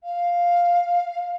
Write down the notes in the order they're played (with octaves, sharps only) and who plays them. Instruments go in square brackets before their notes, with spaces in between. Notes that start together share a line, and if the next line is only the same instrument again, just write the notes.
[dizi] F5